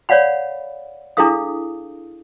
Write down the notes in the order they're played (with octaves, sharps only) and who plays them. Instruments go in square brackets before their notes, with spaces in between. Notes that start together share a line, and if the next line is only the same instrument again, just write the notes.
[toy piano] C#5 D5 F5 F#5 B5
D4 E4 G#4 A4 F5 D#6